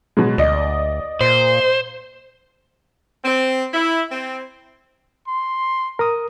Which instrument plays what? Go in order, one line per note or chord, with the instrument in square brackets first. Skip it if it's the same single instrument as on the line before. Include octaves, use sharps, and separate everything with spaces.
[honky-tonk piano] B2 F#3 G#3
[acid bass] D2 [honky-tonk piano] D5 D#5
[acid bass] A#2 [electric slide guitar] C5
[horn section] C4
E4
C4
[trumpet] C6
[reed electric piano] A#4 D#6